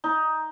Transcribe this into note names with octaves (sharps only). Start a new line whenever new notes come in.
D#4